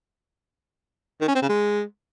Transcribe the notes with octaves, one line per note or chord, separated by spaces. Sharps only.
D#3
C#4
C4
C#3
G#3